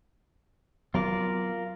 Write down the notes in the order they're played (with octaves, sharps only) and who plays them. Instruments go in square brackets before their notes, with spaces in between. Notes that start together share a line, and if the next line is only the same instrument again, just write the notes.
[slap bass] F#3 B3 C4 [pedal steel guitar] F4 A#4 D5